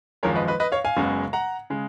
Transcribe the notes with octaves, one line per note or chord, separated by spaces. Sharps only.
G#1 F#2 F3 G#3 A#4 C#5
B4 D#5
B4 D#5
B4 D#5
C#5 F5
F5 G#5
F#1 F#2 C#3 G#3 B3
F#5 A#5
C#3 G#3